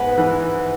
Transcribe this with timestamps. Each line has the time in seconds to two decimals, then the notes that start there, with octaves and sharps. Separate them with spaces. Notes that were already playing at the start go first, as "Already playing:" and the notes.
Already playing: G#2 B3
0.18 E3